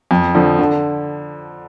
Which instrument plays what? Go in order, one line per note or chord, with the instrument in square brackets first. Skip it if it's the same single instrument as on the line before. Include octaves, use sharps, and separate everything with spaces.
[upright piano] F2
D3 F3
D3